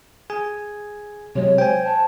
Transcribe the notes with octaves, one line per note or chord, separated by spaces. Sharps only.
G#4 G#5
C3 F#3 G#3 C#5
C5 G5 G#5
A5